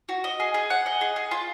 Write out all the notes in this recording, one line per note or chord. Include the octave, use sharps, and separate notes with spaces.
F#4
D#5
G#4
G#4
F#5
D#5
G#4
G#4
F4